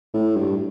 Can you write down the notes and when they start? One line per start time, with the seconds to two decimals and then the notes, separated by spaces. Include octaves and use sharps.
0.14 A2
0.36 G2